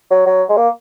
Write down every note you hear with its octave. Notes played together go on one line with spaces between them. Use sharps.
F#3
F#3
G#3
A#3